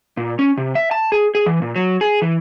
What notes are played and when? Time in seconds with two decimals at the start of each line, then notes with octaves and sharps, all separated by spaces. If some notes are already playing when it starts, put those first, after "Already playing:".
0.17 A#2
0.39 C#4
0.57 C3
0.75 E5
0.91 A5
1.12 G#4
1.35 G#4
1.46 E3
1.62 A#2
1.76 F#3
2.01 G#4
2.22 E3